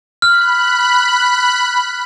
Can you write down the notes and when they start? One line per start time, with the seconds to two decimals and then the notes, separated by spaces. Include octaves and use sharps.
0.22 B5 F6 F#6